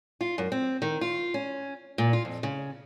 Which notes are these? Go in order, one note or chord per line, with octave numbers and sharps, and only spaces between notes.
F4
F#2
C4
D#3
F4
C#4
A#2
F4
F2
C#3